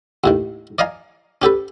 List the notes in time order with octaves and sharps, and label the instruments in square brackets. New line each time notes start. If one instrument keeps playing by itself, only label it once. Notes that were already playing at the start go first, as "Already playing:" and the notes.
[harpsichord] D#2 A2 D#3
D5 D#5 F5 G#5 A#5
C#4 G4 A4 B4